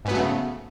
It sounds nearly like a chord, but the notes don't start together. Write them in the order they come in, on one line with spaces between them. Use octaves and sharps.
G#2 B3 F#3 A3 C#3